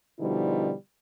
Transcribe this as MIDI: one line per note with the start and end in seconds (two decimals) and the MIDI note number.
0.19 0.72 47
0.19 0.72 50
0.19 0.72 53
0.19 0.72 55
0.19 0.72 63
0.19 0.72 64